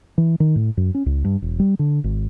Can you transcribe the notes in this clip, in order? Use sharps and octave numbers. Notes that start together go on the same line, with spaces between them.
E3
D#3
A2
F#2
C#4
C#2
G2
E1
G3
D3
G#1